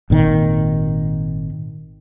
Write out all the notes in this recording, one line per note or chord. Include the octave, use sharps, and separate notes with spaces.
G#1 A#2 D#3